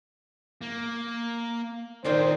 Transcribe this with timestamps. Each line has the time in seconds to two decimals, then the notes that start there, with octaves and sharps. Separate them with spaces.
0.61 A#3
2.04 D#2 A#2 D#3 C4 D#4 C5